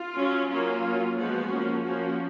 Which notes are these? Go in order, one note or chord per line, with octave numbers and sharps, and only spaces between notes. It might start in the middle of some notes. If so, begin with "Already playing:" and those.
Already playing: F4
F#3 C#4
F#3 A#3 C#4 F4
F#3 C#4
F3 G#3 B3 F#4
F3 A#3 C#4
F3 A#3 C#4 F#4